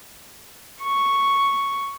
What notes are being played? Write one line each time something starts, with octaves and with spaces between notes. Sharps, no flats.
C#6